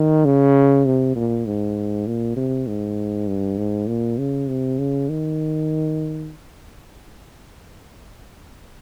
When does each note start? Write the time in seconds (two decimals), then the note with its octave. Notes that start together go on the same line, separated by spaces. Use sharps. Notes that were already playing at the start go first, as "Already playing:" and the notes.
Already playing: D#3
0.25 C#3
0.86 C3
1.16 A#2
1.46 G#2
2.07 A#2
2.37 C3
2.67 G#2
3.27 G2
3.58 G#2
3.88 A#2
4.18 C#3
4.48 C3
4.79 C#3
5.10 D#3